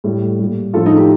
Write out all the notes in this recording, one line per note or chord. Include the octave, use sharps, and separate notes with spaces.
A2 G3
A#2 G3
A2 F3 F4 A4
D#4
D#4 G4